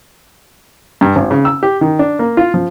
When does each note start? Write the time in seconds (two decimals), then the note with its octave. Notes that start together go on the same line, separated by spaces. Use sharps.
1.01 G2
1.16 G#1
1.31 C#3
1.45 E6
1.63 G4
1.81 D#3
1.99 D4
2.19 A#3
2.37 F4
2.54 F3